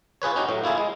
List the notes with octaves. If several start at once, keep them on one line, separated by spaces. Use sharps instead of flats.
F4 G#4 B4 C#5
C#4 D#4 F#4 G4
A2 F#3
A#3 E4 F4 G#4
G#3